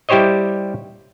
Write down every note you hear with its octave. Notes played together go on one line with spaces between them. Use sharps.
G3 E4 G4 C5 C#5 D#5